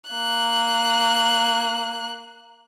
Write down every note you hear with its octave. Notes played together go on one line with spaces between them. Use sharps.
A#3 F#6